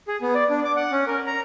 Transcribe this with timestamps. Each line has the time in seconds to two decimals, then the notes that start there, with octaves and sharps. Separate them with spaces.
0.08 G#4
0.22 B3
0.35 D5
0.50 D4
0.65 D6
0.77 F#5
0.92 C#4
1.07 A#4
1.27 A#5